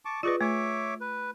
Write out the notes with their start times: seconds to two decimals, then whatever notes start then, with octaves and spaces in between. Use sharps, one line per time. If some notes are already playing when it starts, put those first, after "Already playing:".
0.05 A5 C#6 D6
0.23 F4 G#4 B4 D5 D#5 C#6
0.41 A3 C#5 E5 D6
1.01 B4